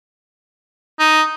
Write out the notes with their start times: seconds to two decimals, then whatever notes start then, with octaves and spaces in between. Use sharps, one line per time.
0.99 D#4